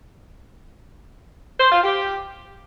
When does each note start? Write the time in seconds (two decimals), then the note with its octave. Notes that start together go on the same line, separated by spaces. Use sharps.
1.60 C5
1.72 F4
1.83 G4